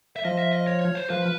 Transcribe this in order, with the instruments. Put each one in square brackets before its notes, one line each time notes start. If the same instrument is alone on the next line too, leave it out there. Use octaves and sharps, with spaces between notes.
[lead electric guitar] E5
[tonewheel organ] F3 [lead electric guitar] D#5
[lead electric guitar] E5
D#5
C#5
C#5
C5
[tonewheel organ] F3 [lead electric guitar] B4